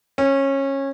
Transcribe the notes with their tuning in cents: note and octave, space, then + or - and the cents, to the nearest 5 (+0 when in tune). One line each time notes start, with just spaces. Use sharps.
C#4 -20